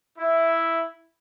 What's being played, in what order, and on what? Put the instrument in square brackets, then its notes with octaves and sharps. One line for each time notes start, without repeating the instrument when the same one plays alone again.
[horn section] E4